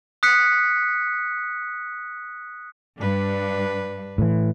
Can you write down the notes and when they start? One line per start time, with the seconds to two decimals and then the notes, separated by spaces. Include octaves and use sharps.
0.23 D#6 F#6 B6 C#7
2.99 G2 D4 B4
4.18 A2 E3